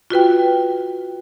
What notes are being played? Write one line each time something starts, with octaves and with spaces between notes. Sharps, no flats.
F4 F#4 B4 G5